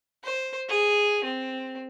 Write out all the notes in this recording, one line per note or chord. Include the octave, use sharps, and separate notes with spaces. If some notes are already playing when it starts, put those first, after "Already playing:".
C5
G#4
C4